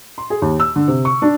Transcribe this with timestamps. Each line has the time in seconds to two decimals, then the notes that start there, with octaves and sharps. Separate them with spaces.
0.18 C6
0.30 G#4
0.42 D#2
0.60 E6
0.76 D3
0.88 C3
1.05 C#6
1.22 D4